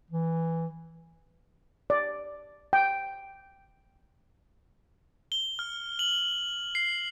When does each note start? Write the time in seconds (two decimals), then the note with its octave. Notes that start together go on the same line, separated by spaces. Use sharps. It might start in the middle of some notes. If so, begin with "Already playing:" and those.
0.10 E3
1.90 D5
2.73 G5
5.32 G7
5.59 F6
5.99 F#7
6.75 C7